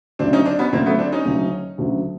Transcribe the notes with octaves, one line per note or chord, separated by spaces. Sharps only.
D2 C#3 F#3 C4 D4
C#4 D#4
C4 D4
B3 C#4
D2 C#3 F#3 A#3 C4
A3 B3
C4 D4
C#4 D#4
D2 C#3 F#3
D2 C#3 F#3